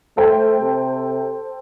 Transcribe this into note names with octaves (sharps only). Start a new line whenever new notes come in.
A3 A4 C5 G5
C3